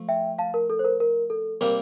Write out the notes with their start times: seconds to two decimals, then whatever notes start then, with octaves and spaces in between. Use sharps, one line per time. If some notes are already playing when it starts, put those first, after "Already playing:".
Already playing: F3 A3
0.09 E5 G5
0.38 F5 A5
0.54 A#4
0.70 A4
0.79 C5
0.84 A#4
1.00 A#4
1.30 A4
1.61 C3 G3 A#3 A#4